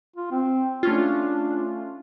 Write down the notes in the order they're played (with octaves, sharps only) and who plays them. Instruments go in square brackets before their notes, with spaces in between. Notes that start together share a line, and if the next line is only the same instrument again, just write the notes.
[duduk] F4
C4
[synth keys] A3 C#4 F4 [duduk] D4